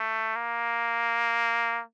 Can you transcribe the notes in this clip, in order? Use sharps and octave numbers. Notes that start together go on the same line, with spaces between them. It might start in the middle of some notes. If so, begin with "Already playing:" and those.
Already playing: A3
A#3